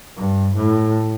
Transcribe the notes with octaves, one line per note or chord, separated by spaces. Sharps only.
G2
A2